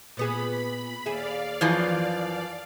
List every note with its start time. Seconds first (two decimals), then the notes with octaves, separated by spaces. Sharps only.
0.17 A#2 B3 G#4 B5
1.06 D#2 G#4 D5 E5 F5
1.61 F#2 E3 F3